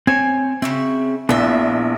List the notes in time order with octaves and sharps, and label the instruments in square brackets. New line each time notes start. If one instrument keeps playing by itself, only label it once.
[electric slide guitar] C4 C5 C#5 [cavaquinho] G#5
[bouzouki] C#3 F#4 E5 [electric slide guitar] C4
[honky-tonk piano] A#1 [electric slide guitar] B3 E4 [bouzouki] F4 E5